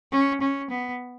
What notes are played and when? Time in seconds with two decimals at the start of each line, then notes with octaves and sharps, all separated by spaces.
0.12 C#4
0.41 C#4
0.70 B3